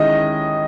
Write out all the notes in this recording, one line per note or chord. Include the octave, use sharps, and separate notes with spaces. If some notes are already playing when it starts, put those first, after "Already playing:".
Already playing: D#3 G#3 C#4 E4 D#5